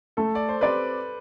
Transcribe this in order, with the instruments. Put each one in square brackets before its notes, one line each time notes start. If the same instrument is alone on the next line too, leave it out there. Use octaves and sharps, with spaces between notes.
[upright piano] A3 [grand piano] A4
[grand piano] D5
C5
[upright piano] C4 G4 D5 [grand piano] B4